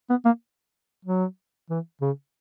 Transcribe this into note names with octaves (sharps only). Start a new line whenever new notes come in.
B3
A#3
F#3
E3
C#3